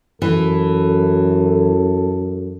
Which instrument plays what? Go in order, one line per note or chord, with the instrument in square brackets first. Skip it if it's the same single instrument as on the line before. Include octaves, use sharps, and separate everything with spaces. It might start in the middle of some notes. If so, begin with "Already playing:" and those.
[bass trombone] F#2 [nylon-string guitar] E3 [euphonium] A4